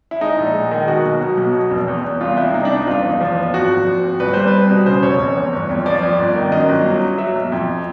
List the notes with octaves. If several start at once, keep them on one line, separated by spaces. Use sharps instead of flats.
E4
G#3 D#4
A#1
G#3
D#3
B2 F#4
B1
B2
B1
B2
F1
E2
E2
C2 F4
C2 E4
C2 D#4
D4
C2
D#4
F#1 F4
E2
F3
F#1
G#1 F#4
F3
F3
G#1
C2 B4
G3 C5
B4
C2
B2
C#3 C5
F1 C#5
F1
E2
G1
F2
F3 D5
F2
G1
D#3
F#2 D#5
G1
F#3
F#3
F#3 E5
B1
F2